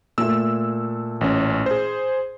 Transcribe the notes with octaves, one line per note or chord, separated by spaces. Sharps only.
A#2 A3 E6
A1 C#4
G#4 C5